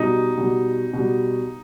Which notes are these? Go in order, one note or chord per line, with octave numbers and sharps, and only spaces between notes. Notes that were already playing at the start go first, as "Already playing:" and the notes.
Already playing: B2 G3 D#4
B2 G3
B2 G3